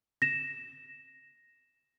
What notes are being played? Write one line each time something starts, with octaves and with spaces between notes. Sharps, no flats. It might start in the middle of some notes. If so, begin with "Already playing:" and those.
A#6 E7